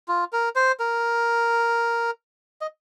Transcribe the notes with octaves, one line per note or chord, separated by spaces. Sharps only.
F4
A#4
C5
A#4
D#5